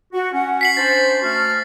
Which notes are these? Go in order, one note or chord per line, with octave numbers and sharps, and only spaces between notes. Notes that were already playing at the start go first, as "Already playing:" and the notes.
F#4
C#4 F#5
B6 C7 F#7
C#4 D4 C5 A6
A3 F#4 F6